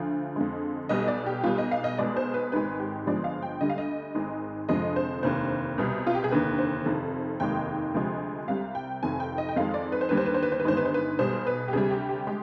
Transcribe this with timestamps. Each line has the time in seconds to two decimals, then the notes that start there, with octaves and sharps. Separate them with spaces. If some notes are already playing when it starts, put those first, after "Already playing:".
Already playing: D2 D3 F3 F5
0.36 F2 D3 G#3
0.89 B1 B2 G3 D#5
1.08 D5
1.26 G4
1.44 B1 B2 G3 F4
1.58 D#5
1.72 F5
1.84 D#5
1.98 B1 B2 G#3 D5
2.17 C5
2.34 B4
2.52 G#1 G#2 D#3 G#3 B4
2.79 G4
3.06 G1 G2 F3 G#3 D5
3.24 F5
3.42 G5
3.61 D2 D3 G3 D#5
3.70 F5
3.78 D#5
4.15 G#1 G#2 D#3 G#3
4.69 F1 F2 D3 F3 G#3 D#5
4.96 C5
5.23 F1 D#2 D3 C5
5.78 C2 B2 G3
6.07 F4
6.15 G4
6.24 G#4
6.31 F1 D#2 D3 B4
6.58 C5
6.86 F1 F2 D#3
7.40 F1 D#2 D#3 G#3 G5
7.94 D2 C3 F3 G#3
8.48 C2 C3 G3 F5
8.75 G5
9.02 F1 F2 D#3 G#5
9.20 G5
9.38 D#5
9.49 G5
9.56 F2 D#3 G#3 F5
9.74 D5
9.92 B4
10.01 C5
10.09 D#2 D3 G3 B4
10.17 C5
10.26 B4
10.34 C5
10.43 B4
10.52 C5
10.60 B4
10.65 G1 G2 D#3 G#3 C5
10.77 B4
10.85 C5
10.94 B4
11.19 B1 B2 G3 C5
11.47 B4
11.68 G4
11.73 D2 C3 G3 G#4
11.91 G4
12.09 G4
12.27 G#3 G4